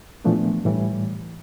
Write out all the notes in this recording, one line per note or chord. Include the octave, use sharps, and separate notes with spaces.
A#2 E3 F3 A3 B3 D4
A2 E3 G3